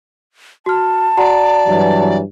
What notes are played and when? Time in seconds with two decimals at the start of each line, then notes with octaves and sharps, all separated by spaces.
0.66 F#4 A5 F6
1.17 F#4 D5 F#5 A#5
1.67 G2 E3 F#3